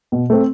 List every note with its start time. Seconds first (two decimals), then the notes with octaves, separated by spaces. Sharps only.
0.12 B2
0.30 A3 C4